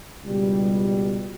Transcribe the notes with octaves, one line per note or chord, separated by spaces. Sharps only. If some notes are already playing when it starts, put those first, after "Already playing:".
C#2 B2 G3